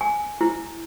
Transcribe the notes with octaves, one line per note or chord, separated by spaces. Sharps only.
G#5
E4